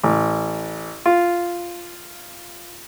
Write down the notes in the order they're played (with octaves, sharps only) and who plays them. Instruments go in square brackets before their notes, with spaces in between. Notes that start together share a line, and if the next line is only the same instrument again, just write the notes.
[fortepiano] A1
F4